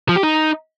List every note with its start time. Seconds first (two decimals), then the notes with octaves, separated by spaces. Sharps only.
0.09 F3
0.16 G4
0.23 D#4